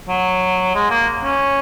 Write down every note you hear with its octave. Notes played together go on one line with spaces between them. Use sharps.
F#3
G#3
A#3
C#4